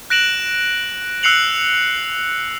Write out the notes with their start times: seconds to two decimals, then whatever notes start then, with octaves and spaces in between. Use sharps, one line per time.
0.10 F#6 A#6 D7 E7 F#7
1.23 E6 F#6 C7 C#7 F7 F#7